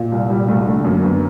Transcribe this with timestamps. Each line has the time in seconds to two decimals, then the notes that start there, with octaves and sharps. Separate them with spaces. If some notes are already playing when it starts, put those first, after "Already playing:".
Already playing: A#2
0.12 C2
0.30 A#2 G3
0.48 C2 A3
0.66 D3 A3
0.84 F#2 A#3
0.97 A#3
1.03 D2 B3